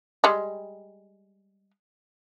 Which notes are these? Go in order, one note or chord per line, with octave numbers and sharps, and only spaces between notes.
G3 G#3